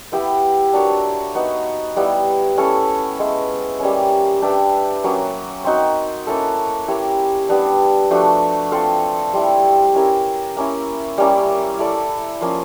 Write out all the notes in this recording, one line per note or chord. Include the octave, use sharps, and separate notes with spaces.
B3 E4 G4 B4
D4 F#4 A#4 C#5
B3 D#4 F#4
G3 B3 E4
A3 C#4 E4 A4
G#3 B3 E4
G3 A#3 C#4
D4 G4 B4 E5
F#3 A#3 C#4
C4 D#4 F#4
A#3 C#4 E4 A4
E4 G4 A#4 C#5
G3 B3 D4
F3 A3 D4 F#4
C4 F4 A4
G3 C4 E4
C#4 E4 G4 A#4
A#3 C#4 E4
G3 A#3 C#4 E4
E4 A4 D5
F3 A#3 C#4 F4